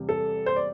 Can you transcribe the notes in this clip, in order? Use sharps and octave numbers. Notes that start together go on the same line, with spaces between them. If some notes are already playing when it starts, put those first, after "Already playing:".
Already playing: E2 C3 G3
A4
C5
D5